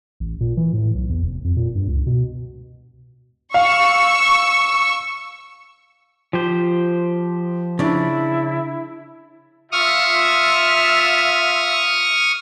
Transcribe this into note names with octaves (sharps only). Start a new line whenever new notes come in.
A1
A#2
E3
A2
B1
E2
F1
F2
A#2
G2
C#2
B2
F5 C#6 E6
F3 G4 C5
C#3 D4 E4
F4 E5 C#6 D#6 F6